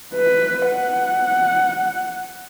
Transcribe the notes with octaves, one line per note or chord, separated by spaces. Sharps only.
B4
F#5